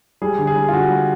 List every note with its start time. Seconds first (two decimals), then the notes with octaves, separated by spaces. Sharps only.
0.22 G3 G#4
0.39 D3
0.47 G#4
0.55 G3
0.68 F4
0.73 D3 F#4
0.89 G3